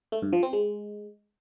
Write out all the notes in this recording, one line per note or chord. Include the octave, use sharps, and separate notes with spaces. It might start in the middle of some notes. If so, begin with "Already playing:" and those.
A3
G2
F3
C4
G#3